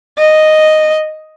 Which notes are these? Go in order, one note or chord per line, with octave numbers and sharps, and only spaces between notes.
D#5